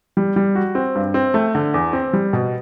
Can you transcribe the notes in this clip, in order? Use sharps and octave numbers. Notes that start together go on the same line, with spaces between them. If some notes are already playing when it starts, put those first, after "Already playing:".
G3
G3
F#4
C4
G2
C4
A3
D3
E2
C4
G3
B2